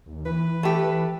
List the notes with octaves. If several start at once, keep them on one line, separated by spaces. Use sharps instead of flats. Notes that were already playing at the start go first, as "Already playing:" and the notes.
D#2
E3 B4
A3 G4